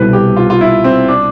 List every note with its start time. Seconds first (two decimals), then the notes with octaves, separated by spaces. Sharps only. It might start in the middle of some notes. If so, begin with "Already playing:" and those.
Already playing: C2 B2 G3 A4 B4
0.13 G4
0.36 F4
0.50 F4
0.61 E4
0.84 C4
1.08 D4